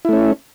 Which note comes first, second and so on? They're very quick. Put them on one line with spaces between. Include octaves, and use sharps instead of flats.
E4 A3 C#4